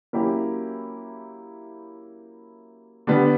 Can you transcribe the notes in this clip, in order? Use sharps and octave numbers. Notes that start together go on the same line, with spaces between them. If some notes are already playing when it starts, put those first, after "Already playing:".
F#3 A#3 C#4 E4 G4
D3 G3 B3